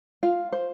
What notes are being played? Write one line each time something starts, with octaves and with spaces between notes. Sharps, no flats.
F4 F5
C5